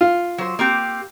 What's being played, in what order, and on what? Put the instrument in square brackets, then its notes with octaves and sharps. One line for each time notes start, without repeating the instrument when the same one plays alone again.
[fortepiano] F4
[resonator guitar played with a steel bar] F#3 C5
A#3 C4 G4